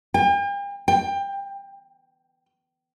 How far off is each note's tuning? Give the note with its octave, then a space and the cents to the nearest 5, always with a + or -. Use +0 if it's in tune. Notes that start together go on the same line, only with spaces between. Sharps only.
G5 +45
G5 +20